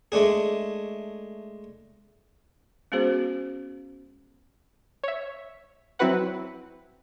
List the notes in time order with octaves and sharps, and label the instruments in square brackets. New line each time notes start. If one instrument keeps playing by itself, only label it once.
[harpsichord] G#3 A3 D4 G#4
[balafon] G#3 B3 C#4 F#4 G#4 C5
[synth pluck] C#5 E5
F#3 C4 E4 F#4 B4 F#5